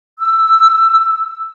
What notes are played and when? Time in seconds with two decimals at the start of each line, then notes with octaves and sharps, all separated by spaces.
0.19 E6